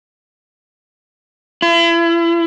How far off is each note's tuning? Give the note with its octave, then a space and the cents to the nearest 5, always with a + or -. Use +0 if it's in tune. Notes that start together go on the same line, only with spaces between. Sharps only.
E4 +35